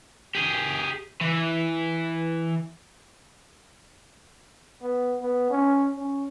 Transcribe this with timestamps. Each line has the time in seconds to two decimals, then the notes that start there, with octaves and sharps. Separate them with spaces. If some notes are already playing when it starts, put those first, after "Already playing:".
0.35 G4 G#4
1.21 E3
4.82 B3
5.21 B3
5.50 C#4
5.96 C#4